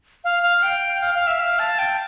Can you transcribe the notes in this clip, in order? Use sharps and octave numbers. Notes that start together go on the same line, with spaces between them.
F5
F5
G5
F5
F5
E5
F5
A5
G5